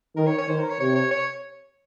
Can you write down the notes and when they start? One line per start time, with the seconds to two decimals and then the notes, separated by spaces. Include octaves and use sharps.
0.16 D#3 A#4
0.27 C#5
0.38 C#5
0.48 D#3 C5
0.59 A#4
0.70 C#5
0.80 C3 C#5
0.96 C#5
1.11 C#5